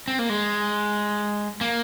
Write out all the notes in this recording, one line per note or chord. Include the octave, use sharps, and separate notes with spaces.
C4
A#3
G#3
A#3